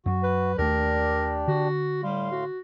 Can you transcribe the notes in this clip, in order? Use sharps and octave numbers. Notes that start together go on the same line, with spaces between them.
F#2 F#3 F#4
B4
D#2 A3 D4 G4 A#4 D5
D3 F#4
A2 G3 F5 C6
F#4